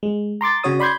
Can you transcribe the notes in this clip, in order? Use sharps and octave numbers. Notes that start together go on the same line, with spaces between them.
G#3
A#5 C6 D6 A6
C#3 F#4 C#5 D#6
D5 B5 C6 G6 G#6